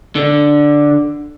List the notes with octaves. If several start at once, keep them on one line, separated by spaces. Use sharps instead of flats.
D3